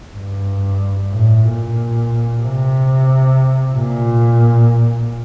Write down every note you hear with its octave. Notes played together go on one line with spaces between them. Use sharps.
G2
A2
A#2
C3
A#2